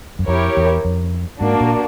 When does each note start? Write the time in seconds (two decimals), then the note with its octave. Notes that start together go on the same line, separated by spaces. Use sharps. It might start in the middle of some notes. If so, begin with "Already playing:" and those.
0.19 F#2
0.28 F2 E4 G4 A#4 C#5
0.57 E2
0.85 F2
1.41 G#2 A#3 D4 F#4
1.61 A#2